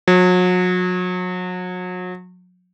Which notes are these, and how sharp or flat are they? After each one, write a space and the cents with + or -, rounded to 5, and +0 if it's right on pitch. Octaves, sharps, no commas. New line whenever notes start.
F#3 -35